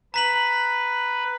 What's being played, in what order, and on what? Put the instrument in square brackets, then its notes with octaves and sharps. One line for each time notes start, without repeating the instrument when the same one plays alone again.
[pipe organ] B4 [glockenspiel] A#5 B6 F#7